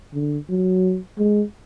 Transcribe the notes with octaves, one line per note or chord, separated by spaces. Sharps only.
D3
F#3
G#3